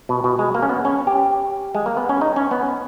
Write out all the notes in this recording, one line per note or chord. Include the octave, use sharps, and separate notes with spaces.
B2
B2
G#3
A#3
C#4
B3
C#4
G4
G#3
A#3
B3
C#4
D#4
C#4
B3